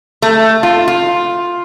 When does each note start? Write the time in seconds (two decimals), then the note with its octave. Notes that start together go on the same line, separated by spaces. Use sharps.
0.22 A3
0.63 F4
0.88 F4